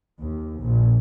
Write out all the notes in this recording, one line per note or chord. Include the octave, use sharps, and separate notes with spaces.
D#2
A#1